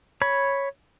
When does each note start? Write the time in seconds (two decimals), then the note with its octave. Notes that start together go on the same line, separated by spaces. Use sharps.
0.22 C#5 B5